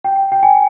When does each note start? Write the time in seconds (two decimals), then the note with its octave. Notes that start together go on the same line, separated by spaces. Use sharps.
0.04 G5
0.32 G5
0.43 G#5